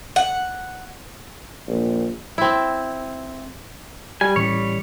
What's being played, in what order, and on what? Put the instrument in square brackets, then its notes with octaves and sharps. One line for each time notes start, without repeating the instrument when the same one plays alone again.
[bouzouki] F#5
[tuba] A#1
[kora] C4 E4
[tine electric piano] G3 [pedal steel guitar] G#5
[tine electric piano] A1 [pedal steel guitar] G3 C#5